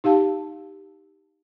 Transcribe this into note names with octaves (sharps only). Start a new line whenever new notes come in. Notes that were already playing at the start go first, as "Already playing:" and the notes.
D#4 G4 F5 A5